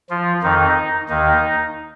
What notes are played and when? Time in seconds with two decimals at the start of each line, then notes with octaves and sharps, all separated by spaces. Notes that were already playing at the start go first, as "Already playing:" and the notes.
0.10 F3 F4
0.43 F2 D#3 D#4
1.09 D#2 D#3 D#4